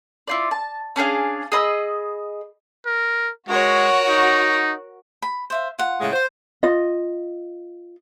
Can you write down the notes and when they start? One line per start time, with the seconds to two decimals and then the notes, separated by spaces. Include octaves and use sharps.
0.27 E4 F4 D5
0.51 A5
0.96 C#4 D4 G#4 F5
1.52 G#4 D#5 B5 E6
2.86 A#4
3.49 G#3 F#4 A#4 C#5
4.08 D#4
5.22 B5
5.50 C5 E5 F5
5.79 F4 F#5
6.00 A2 C#3 G#3
6.13 C5
6.63 F4 D#5